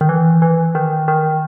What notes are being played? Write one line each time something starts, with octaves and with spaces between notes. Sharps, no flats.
D#3
E3
E3
D#3
D#3